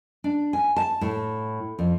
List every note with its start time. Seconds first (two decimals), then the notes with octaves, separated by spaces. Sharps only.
0.24 D4
0.53 G#5
0.76 A5
1.01 A2
1.79 F2